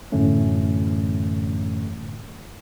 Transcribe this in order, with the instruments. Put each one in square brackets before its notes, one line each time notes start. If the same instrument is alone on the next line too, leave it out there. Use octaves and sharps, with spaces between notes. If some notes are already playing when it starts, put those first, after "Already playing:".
[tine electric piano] F#2 A2 D3 E3 A3 C#4